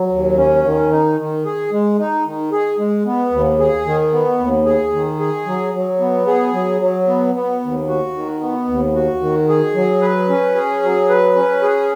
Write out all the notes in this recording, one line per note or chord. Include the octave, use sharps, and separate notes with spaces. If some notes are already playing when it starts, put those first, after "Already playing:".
Already playing: F#3
D#2
C#4
D#3
D#4
D#3
G#4
G#3
D#4
D#3
G#4
G#3
B3
D#2
G#4
D#3
B3
D#2
G#4
D#3
G#4
F#3
F#3
B3
G#4
F#3
F#3
B3
B3
D#2
F#4
D#3
B3
D#2
F#4
D#3
G#4
F#3
B4
C#4
G#4
F#3
B4
C#4
G#4